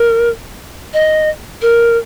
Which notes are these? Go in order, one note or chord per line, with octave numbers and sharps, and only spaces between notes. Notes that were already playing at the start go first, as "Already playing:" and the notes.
Already playing: A#4
D#5
A#4